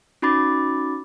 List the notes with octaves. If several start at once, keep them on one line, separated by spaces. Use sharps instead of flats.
C#4 D#4 F#4 B5 D6 A6